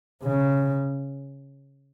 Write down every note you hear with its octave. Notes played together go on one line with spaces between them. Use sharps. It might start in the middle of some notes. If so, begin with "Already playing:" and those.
C#3